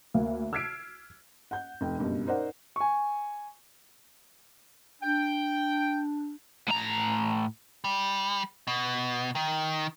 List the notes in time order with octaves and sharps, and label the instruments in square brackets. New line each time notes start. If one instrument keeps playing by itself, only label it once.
[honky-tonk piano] D2 A#3
E6 F6 G#6 B6 C7 D7
[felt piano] F#5 G6
F1 G5
F#1 G2 B2
D#4 A#4 C5 D5 F#5
[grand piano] G#5 C#6
[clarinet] D4 [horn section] G5
[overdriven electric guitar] A2 A#5
[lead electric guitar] G3
B2
D#3